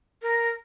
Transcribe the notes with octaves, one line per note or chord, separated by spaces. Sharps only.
A#4